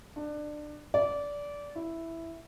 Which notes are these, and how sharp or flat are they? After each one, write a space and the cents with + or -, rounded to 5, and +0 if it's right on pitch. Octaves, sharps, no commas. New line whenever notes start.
D4 +25
D5 -20
E4 +0